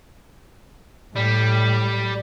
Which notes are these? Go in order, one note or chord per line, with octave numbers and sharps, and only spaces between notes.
A2 G3